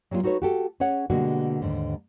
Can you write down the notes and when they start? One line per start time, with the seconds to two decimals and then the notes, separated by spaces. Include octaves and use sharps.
0.11 F#3 G3 A#3 D#4 F4
0.23 D#4 F#4 A4 B4 C#5
0.42 F#4 G4 A4
0.80 C#4 G#4 C#5 F#5
1.10 B2 D3 G3 G#3 A#3 F#4
1.62 D#2 G#2 D3